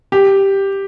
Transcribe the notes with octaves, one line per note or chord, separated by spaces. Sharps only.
G4